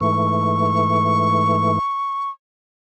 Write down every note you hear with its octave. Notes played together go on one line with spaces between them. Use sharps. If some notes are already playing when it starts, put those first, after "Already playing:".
G#2 E3 A3 C#6